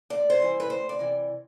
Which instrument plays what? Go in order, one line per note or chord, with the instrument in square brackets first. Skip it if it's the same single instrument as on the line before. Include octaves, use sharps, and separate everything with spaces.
[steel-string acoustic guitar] D2 D5
C5
C3 E3 G3
B4
D2 C5
D5
C3 E3